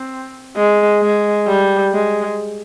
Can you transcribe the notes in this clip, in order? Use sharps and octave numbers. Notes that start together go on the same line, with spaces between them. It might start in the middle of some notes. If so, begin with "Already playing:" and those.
Already playing: C4
G#3
G#3
G3
G#3